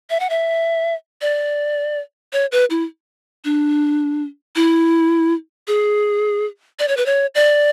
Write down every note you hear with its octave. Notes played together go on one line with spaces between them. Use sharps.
E5
F#5
E5
D5
C#5
B4
E4
D4
E4
G#4
D5
C#5
B4
C#5
D5